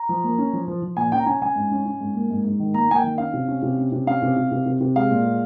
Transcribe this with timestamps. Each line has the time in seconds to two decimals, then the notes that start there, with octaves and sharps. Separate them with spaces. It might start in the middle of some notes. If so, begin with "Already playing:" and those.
Already playing: A#5
0.09 F3
0.24 A#3
0.38 C#4
0.53 F3
0.68 F3
0.82 F3
0.97 A#2 G#5
1.12 C#4 G5
1.19 A#5
1.26 C#4 G#5
1.42 C#4 G#5
1.56 G#2
1.71 C#4
1.86 C#4
2.01 G#2
2.15 A#3
2.30 G#2
2.45 G#2
2.60 D#3
2.74 A#3 A#5
2.89 A#3 G#5
2.96 G5
3.04 D#3
3.18 C#4 F5
3.33 C3
3.48 C#4
3.63 C3
3.78 C#4
3.92 C3
4.07 C#4 F5
4.22 C3
4.36 C3
4.51 C3
4.66 C3
4.81 C3
4.95 G#3 F5
5.10 A#2
5.26 G#3